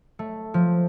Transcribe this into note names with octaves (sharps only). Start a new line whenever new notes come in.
A3
F3